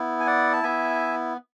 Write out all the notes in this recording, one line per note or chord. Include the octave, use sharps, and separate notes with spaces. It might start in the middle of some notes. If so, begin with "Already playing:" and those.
Already playing: B3 E4
G#5
D5 F#5
A5
B3 E4 E5 G#5